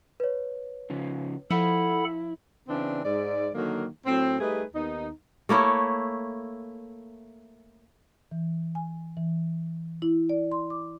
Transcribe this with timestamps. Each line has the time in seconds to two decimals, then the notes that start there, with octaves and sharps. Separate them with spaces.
0.20 B4 C#5
0.90 C#3 F3
1.51 F3 E4 A4 F#5 B5
2.68 C#3 E3 C4 D4
3.04 G#2 D5
3.54 D3 D#3 F#3 A#3
4.05 A2 F#3 C4
4.40 G3 A3 D#4 G#4 B4
4.74 D#2 B3 D#4
5.49 A3 A#3 E4 C#5
8.31 E3
8.75 G#5
9.17 E3
10.02 E4
10.29 D5
10.51 C6
10.70 D6